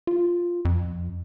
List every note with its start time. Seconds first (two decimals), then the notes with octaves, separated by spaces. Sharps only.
0.07 F4
0.65 F2